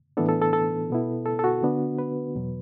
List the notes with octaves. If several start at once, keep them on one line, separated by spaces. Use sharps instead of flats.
A2 E3 B3 D4 A4
A4
A4
A4
B2 B3 E4
A4
A4
F#4
D3 B3 D4
B4
E2 B2 F#3